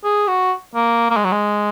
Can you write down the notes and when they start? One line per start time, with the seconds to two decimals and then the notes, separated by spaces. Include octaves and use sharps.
0.04 G#4
0.27 F#4
0.75 A#3
1.10 A#3
1.16 G#3
1.24 F#3
1.32 G#3